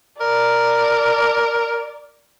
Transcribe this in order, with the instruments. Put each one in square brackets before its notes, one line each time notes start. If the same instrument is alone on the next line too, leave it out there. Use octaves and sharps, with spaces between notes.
[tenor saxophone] A#4 [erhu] D5